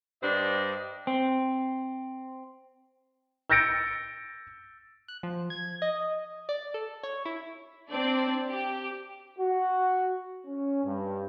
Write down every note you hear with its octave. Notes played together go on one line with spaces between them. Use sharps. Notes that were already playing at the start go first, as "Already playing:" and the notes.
G2 G3 D4 C5 D#5
C4
E6 G6 A6 A#6 C#7 D7
F#6
F3
G#6
D#5
D5
A4
C#5
E4
C4 D4 D5
G4
F#4
C#4
G2